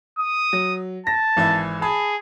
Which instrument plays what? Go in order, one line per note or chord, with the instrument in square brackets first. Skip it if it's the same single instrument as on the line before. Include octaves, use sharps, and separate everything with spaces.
[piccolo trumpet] D#6
[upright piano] F#3
[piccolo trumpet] A5 [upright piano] A#6
[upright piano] G#1 E3 E4
[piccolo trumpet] G#4 [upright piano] A5 B5